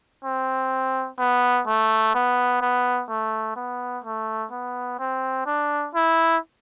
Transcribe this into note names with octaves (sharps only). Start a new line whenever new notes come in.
C4
B3
A3
B3
B3
A3
B3
A3
B3
C4
D4
E4